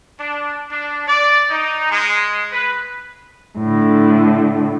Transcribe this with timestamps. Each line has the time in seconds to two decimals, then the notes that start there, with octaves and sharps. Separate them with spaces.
0.19 D4
0.71 D4
1.07 D5
1.50 D#4
1.90 G#3
2.52 B4
3.58 A2 D3